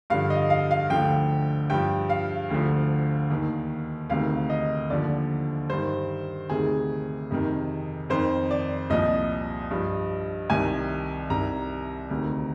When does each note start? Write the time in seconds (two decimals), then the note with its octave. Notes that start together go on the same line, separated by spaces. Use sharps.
0.10 G2 D3 F3 F5
0.30 D#5
0.50 F5
0.71 F5
0.90 D2 D3 F3 G5
1.70 G2 F3 G5
2.10 F5
2.50 D2 D3 F3
3.30 D#2 D#3
4.10 D2 C3 D#3 F5
4.50 D#5
4.90 D#2 D3 F3 D5
5.70 G2 D#3 C5
6.50 D2 C3 D#3 G#4
7.31 F2 C3 D#3
8.10 F2 D#3 C5
8.51 D5
8.90 C2 A#2 F3 D#5
9.71 G2 F3
10.50 C2 C3 D#3 G#5
11.30 C2 C3 D#3 A#5
12.10 D2 C3 D#3